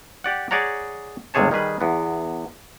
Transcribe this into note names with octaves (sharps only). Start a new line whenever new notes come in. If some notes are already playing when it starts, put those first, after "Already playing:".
G4 D5 F#5
G#4 C#5 D5 F#5 A#5
G1 C#2 C3 G#4 C#5 A5
D#3 G3 G#4 B4
E2 B3